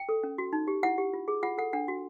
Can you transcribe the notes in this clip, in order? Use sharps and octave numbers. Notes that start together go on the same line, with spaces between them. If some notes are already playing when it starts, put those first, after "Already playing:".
Already playing: G5
A4
C#4
F#4
D#4
G4
E4 F#5
G4
F4
G#4
F4 F#5
A4 F#5
D4 F#5
F#4